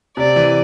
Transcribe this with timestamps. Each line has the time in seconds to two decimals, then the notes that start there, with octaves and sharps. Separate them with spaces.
0.17 C3 D5
0.36 E3